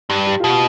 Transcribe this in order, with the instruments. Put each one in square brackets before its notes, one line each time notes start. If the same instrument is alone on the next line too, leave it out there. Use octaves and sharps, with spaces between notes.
[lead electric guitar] G2 [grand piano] G4
[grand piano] G4
F4
[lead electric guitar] B2 [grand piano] G4